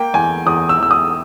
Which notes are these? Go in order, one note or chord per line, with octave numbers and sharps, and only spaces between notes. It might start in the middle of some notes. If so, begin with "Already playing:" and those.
Already playing: A#3 G5
E2 G#5
E2 D#6
E6
E2 E6
D#6